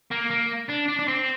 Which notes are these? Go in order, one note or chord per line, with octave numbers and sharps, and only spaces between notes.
A#3
A#3
D4
D4
D4
C4